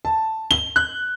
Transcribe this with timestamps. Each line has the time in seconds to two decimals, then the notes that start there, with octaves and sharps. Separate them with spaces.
0.05 A5
0.51 G7
0.76 F#6